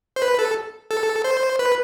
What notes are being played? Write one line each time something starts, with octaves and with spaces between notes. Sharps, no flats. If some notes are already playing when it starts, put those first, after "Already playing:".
C5
B4
A4
A4
C5
B4